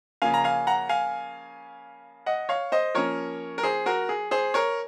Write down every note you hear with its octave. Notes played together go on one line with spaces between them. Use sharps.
C#3 F3 A#3 C#4 F5 G#5
A#5
F5 G#5
F#5 A#5
F5 G#5
D#5 F#5
C#5 F5
C5 D#5
F3 A#3 C#4 A#4 C#5
A#4
G#4 C5
F#4 A#4
G#4
G#4 C5
A#4 C#5